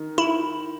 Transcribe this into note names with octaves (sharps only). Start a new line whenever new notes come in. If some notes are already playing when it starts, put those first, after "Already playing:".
Already playing: D#3
E4